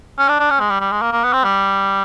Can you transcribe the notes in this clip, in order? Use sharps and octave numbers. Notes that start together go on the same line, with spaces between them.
C#4
D4
D4
C#4
G#3
G3
G3
G#3
A#3
A#3
B3
C4
G3